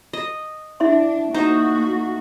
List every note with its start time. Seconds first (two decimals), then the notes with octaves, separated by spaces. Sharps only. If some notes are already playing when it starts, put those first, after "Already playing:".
0.13 D#5
0.80 D4 E4 E5 C6
1.34 A3 A#3 D#4 F#4 C5 A#5